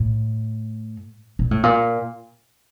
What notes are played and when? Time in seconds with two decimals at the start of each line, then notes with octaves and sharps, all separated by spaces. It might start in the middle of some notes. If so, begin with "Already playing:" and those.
Already playing: A2
1.39 A#2
1.51 A2
1.63 A#2